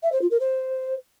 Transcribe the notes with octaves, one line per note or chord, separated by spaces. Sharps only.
E5
C5
F4
A#4
C5